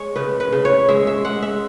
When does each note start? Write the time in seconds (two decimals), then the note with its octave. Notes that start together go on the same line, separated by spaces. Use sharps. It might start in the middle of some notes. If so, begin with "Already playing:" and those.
Already playing: G#3 C#5
0.16 C#3 B4
0.40 B4
0.53 C#3
0.65 C#5
0.88 G#3 E5
1.07 E5
1.24 G#3 F#5
1.42 E5